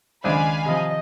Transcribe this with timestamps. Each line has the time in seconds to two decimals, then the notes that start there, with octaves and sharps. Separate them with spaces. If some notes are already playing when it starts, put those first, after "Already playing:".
0.24 C#2 D#3 D4 C5 F5 G#5 B5
0.65 C3 F3 D#5